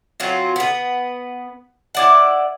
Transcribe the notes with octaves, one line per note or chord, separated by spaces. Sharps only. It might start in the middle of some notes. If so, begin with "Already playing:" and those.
F#3 C4 F4
B3 B4
E4 D5 F#5